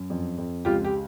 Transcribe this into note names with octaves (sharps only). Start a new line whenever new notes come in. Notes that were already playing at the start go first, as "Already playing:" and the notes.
Already playing: F#2
F2
F2
C#2 F4 G4
G4